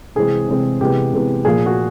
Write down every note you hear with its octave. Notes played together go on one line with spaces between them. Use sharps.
C3 E3 G#3 C4 G#4
C3 E3 G#3 C4
C3 E3 G#3 B3 G4
C3 E3 G#3 B3
A#2 F3 A#3 G#4
F#4